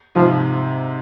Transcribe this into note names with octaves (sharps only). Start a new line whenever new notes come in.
G#2 C3 F3